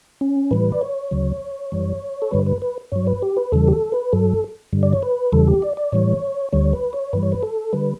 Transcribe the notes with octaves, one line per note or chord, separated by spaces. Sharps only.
C#4
A2 E3 G3 B4
D5
C#5
D2 C#3 F#3
F#2 E3 G3
A4
G2 D3 G3 B4
B4
B4
G2 F#3 C#5
B4
G4
B4
E2 C#3 E3 G3 A4
G4
A4
B4
G2 F#3 A4
G2 D3 G3
D5
C#5
B4
E2 C#3 E3 G3 A4
G4
D5
D5
A2 E3 G3 C#5
D2 D3 G3 C#5
B4
C#5
G2 E3 G3 B4
C#5
B4
A4
D3 G3 B4